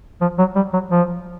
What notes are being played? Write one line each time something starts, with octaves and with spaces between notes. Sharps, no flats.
F3
F#3
G3
F#3
F3